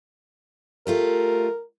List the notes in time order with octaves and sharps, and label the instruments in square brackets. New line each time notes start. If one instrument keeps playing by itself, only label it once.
[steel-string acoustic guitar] G3 A3 F4 [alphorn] A#4